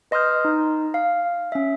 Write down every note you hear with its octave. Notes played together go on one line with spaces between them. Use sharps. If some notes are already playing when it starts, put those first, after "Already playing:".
B4 D#5 C6 D#6 F6 G6
D#4
F5
C#4 E5